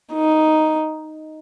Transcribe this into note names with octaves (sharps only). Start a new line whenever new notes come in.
D#4